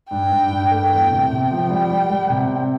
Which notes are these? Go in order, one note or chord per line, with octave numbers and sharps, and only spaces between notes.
G2 G5
G2
G2
A3
E2 G5
C3
C3 G5
F3
G3
G3
G3
C3
C4